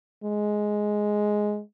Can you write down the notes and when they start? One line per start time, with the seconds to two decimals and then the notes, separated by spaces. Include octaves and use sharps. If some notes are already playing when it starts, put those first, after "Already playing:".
0.24 G#3